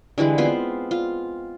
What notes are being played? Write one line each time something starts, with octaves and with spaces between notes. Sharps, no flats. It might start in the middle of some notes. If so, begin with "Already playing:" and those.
D3 E3 G3 G#3
B3 C4 F4 C5
F4